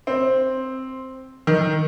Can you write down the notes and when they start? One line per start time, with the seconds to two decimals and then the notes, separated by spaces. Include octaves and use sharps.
0.07 C4
1.47 D#3